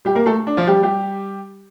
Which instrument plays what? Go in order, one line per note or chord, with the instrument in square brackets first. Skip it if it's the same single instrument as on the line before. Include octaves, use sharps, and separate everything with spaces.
[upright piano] G3 G4
A#3 A#4
A3 A4
D4
F3 F4
G3 G4
G3 G4